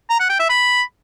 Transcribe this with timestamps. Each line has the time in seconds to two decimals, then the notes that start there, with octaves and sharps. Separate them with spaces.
0.10 A#5
0.20 F#5
0.30 G5
0.40 E5
0.50 B5